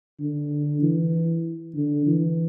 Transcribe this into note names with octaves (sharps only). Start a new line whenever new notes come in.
D3
E3
D3
E3